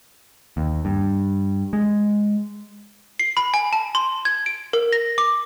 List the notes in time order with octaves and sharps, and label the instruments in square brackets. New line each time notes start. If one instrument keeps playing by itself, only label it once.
[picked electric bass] D#2
G2
G#3
[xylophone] C7
B5
G#5
A5
C6
G#6
D7
A#4
A#6
D6